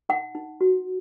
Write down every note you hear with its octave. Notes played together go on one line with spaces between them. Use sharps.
D#4 F#5
D#4
F#4